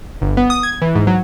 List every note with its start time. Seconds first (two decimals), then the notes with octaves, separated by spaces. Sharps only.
0.22 G1
0.37 B3
0.50 D#6
0.63 G#6
0.82 E3
0.95 G#2
1.07 F#3